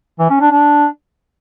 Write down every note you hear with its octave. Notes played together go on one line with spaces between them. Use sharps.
E3
C#4
D4
D4